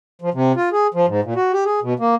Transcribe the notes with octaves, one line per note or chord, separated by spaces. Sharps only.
F3
C3
F4
G#4
F3
G#2
A#2
F#4
G4
G#4
B2
A#3